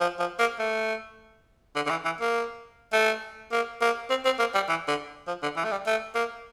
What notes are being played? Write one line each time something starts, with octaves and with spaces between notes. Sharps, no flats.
F3
F3
A#3
A3
D3
D3
E3
E3
A#3
A3
A#3
A#3
C4
C4
A#3
G3
E3
D3
F3
D3
E3
A3
G3
A3
A#3